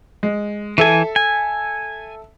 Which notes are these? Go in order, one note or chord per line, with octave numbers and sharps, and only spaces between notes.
G#3
E3 A4 E5 G#5
G#5